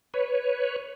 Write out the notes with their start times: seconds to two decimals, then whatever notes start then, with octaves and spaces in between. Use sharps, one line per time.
0.14 B4 C#5